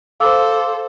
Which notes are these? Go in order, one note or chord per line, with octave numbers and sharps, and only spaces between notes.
A4 C5 F5 D6 E6